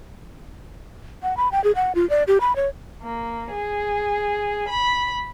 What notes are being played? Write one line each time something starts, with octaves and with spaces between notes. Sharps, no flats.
F#5
B5
G5
G#4
F#5
F4
D5
G4
B5
C#5
A#3
G#4
B5